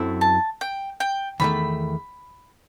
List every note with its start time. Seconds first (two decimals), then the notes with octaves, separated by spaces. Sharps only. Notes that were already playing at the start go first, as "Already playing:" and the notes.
Already playing: F#2 F#3 C4 E4 A4
0.21 A5
0.61 G5
1.00 G5
1.40 E2 D#3 A3 B5